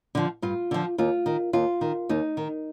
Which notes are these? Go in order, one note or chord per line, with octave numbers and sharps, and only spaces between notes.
D3 F3
G2 F4
D3 F3
D#2 F4
D#3
D#2 F4
D#3
D#2 D#4
D#3